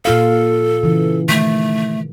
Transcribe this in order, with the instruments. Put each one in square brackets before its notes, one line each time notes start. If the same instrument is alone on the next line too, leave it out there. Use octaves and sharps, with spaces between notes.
[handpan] A#2 F4 F5 [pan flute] A4
[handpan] C#3 E3
[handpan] D#3 [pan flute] A3